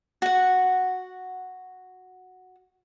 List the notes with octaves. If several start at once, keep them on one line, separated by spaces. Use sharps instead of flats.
F#4 F#5